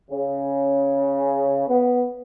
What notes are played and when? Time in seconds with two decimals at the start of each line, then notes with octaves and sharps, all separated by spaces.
0.11 C#3
1.68 B3